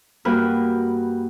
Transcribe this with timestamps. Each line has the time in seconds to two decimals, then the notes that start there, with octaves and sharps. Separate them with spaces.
0.25 G2 A#3 F#4 A#4 B4 F6